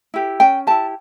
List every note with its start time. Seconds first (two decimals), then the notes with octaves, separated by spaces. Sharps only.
0.14 E4 G4
0.40 C#4 G5
0.67 E4 G4 A5